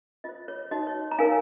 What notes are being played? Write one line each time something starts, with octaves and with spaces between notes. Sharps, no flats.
F4 C5 D#5
C#5
D#4 F#4 C#5 D#5
C#5
A#5
D#4 A#4 C#5 F5 G#5